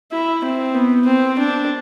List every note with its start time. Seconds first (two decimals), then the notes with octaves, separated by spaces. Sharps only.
0.12 E4
0.44 C4
0.75 B3
1.06 C4
1.39 D4